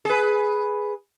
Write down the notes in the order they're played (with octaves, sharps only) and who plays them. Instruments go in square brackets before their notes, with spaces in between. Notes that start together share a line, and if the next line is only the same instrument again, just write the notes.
[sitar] G#4 B4